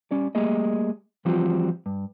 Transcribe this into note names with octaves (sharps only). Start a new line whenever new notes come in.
G3 C#4 D5
G3 A3 A#3 G#4 D#5
E3 F3 G3 C4 F4 F#4
G2